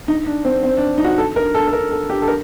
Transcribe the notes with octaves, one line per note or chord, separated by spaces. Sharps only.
D#4
D4
C4
C4
D4
D#4
F#4
A4
A#4
A4
A4
A#4
A4
G4
A4
A#4